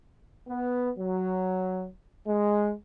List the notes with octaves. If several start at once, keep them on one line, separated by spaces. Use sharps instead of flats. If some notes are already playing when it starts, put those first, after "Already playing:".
B3
F#3
G#3